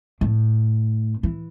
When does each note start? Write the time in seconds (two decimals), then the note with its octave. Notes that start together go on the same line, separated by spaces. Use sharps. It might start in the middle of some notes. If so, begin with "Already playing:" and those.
0.21 A2
1.23 E3